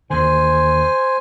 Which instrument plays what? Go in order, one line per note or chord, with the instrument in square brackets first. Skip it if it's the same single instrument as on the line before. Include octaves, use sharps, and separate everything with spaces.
[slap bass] D#2 D3 [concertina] C5 G#5